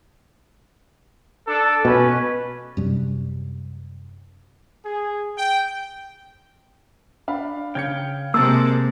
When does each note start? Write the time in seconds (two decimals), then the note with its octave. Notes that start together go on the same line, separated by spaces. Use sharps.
1.47 D4 A4
1.85 B2 C#4 B4
2.77 F#2 C3 G3
4.85 G#4
5.38 G5
7.28 D4 F5 B5
7.75 C#3 F5 G5 G#6 C#7
8.34 C3 G#3 A#3 C5 A5 A#5 E6 A6